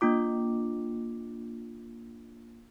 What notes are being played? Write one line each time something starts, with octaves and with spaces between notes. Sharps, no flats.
A#3 D4 F4 D6